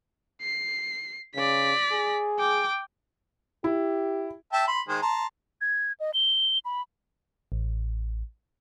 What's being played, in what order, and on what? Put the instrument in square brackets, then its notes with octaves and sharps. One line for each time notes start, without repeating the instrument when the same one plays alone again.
[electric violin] C7
[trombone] C#3 [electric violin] D5 B6
[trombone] G#4
[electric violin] G5 D6
[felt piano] E4 [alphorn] G4
[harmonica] E5 G5 A5
B5 C6
D#3 G#3 C5
A5 A#5 C6
[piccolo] G#6
D#5
G7
B5
[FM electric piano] A1